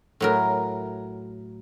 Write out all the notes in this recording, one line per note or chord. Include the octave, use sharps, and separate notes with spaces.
A2 F#3 A#4